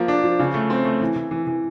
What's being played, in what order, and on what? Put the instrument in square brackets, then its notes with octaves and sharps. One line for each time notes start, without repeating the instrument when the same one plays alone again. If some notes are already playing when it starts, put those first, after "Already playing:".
Already playing: [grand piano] F3 A#3
D4
F3
C#3
A3
C4
A3
E3
E3
E3
E3